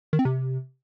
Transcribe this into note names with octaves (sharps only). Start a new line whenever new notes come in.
D#3
C4
C3